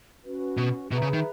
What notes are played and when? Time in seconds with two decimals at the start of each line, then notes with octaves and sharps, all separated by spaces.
0.24 C#4 F#4 B4
0.57 B2
0.91 B2 G#4 B4 E5 A#5
1.02 C#3
1.13 D#3